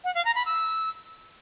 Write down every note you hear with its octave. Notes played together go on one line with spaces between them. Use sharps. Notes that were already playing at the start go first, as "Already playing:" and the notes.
F#5
F5
A#5
B5
E6